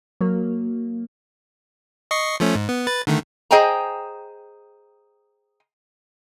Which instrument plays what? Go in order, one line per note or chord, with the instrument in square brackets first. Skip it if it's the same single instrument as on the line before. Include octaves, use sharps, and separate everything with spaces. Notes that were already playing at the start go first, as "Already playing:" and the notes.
[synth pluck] F#3 A#3
[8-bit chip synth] D#5 C#6 C7
F3 A3 C#4
G#2
B3
B4 A6
D3 D#3 A3
[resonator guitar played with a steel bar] G#4 C5 D#5 G5 G#5 A#5